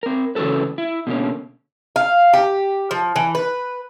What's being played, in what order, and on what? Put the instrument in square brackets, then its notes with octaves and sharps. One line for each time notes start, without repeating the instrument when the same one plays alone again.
[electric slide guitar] C4 A#4
C#3 E3 C#4 F#4 A4 B4
E4
B2 D3 A#3 C#4
[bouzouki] F5
G4
F3
E3
B4